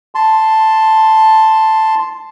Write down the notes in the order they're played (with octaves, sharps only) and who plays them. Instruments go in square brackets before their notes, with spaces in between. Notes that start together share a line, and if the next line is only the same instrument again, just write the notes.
[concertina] A5 C6